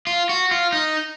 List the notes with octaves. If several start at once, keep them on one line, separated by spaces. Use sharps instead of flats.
F4
F#4
F4
D#4